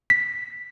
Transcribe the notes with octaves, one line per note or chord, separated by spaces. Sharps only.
B6